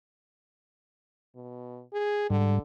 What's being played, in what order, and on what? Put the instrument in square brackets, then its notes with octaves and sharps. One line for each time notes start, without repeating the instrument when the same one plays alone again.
[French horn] B2
G#4
[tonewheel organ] G#2 G3 [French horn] D3